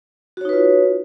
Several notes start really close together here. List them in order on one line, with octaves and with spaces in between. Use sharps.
F#4 C#5 D#4 B4 F4